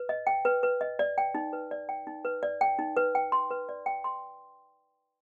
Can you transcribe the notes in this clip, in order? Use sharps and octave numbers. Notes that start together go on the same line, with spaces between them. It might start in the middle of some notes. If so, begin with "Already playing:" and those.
Already playing: B4
D#5
G5
B4
B4
D#5
D5
G5
D#4
B4
D5
G5
D#4
B4
D5
G5
D#4
B4
G5
C6
B4
D5
G5
C6